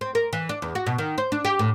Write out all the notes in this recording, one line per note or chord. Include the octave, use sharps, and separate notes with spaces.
C4
A#4
E3
D4
E2
F#4
B2
D#3
C5
D4
G4
A2